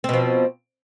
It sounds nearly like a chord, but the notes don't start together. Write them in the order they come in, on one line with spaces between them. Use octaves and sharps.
C4 B2 F3